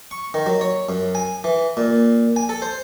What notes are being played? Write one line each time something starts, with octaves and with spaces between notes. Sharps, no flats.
C#6
D#3
F#3
C#5
F#2
G#5
E3
A#2
G#5
A4
C5